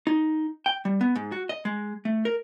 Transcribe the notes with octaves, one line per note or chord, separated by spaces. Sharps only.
D#4
G5
G3
B3
G#2
F#4
D#5
G#3
A3
A#4